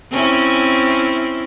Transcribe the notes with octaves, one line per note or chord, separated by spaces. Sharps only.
C4 C#4 E4